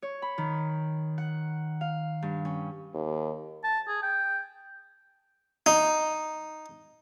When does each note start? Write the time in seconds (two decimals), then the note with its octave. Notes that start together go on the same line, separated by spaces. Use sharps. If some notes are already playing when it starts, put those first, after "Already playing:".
0.02 C#5
0.22 B5
0.38 D#3
1.18 F#5
1.81 F5
2.22 G2
2.45 C#4
2.94 D#2
3.64 A5
3.88 G#4
4.03 G5
5.66 D#4